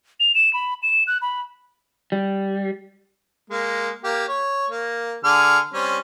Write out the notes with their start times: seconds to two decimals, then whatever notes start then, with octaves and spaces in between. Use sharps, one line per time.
0.20 F7
0.35 E7
0.53 B5
0.83 E7
1.07 F#6
1.22 B5
2.12 G3
3.50 G#3 A#3
4.04 A#3 G4
4.28 C#5
4.69 A#3
5.24 D3 G#4 F6
5.73 G3 C4 C#4